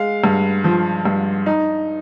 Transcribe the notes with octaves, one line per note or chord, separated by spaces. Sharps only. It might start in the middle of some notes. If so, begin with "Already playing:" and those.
Already playing: G#3 F5
G2
F3
G2
D#4